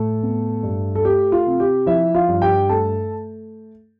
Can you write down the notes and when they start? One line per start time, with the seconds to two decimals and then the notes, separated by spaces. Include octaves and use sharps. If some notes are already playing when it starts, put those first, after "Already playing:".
Already playing: A2 A3 A4
0.22 B3
0.63 G2
0.95 A4
1.05 A3 G4
1.32 F4
1.46 C3
1.60 G4
1.86 F3 E4 E5
2.15 F4 F5
2.28 G2
2.42 G4 G5
2.69 A3 A4 A5